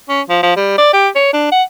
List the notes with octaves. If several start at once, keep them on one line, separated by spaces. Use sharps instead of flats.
C#4
F3
F3
G3
D5
G4
C#5
D4
F#5